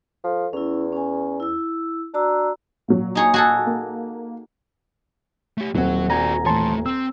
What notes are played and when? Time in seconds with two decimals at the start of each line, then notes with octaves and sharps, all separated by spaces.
0.24 F3 A4
0.53 E2 C#4 E4
0.92 C#4 G#5
1.40 E4 E6
2.14 D4 F#4 A#5 E6
2.88 A#2 F#3
3.15 D#4 G#4 C#5
3.34 F#4 G#4 A4
3.66 A#3
5.58 A3 G4
5.75 D#1 F#3 C4 F#5
6.10 F#4 D5 G#5 A#5
6.46 E3 A3 C#5 A5 C6
6.86 C4 E6